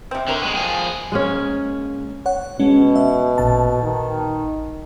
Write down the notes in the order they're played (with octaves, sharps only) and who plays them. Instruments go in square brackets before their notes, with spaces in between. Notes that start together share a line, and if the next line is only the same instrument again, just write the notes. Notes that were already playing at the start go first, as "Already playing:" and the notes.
[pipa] C3 C4
[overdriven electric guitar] D3 [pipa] G4 A#4 C#5
[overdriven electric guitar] G#3 B3
F3 G#4
[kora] G#3 A#3 C#4
[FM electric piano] C#5 F#5
[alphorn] B2 [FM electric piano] G#3 C#4
[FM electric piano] E5
A1 A#2 A5
[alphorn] D#3